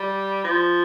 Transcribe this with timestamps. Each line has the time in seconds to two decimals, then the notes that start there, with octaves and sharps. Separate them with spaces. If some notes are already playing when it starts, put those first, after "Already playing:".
Already playing: G3
0.44 F3